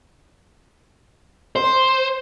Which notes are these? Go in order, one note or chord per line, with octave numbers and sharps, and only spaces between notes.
C5